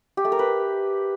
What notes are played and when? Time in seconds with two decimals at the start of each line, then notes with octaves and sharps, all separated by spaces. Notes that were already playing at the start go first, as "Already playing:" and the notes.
0.17 G4
0.25 A3
0.32 A#4
0.39 B4